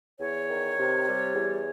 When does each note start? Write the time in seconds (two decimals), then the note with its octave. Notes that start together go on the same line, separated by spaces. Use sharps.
0.19 E2 C#5
0.49 D#3
0.78 C3
1.07 G3
1.35 E2